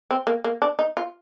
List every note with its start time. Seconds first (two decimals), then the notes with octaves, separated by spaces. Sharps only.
0.11 C4
0.27 A#3
0.44 A#3
0.62 D4
0.79 D#4
0.97 F4